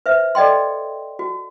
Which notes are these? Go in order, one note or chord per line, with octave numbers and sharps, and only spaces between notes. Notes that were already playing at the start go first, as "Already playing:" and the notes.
B4 C5 E5
A4 D5 D#5 G5 C6
F#4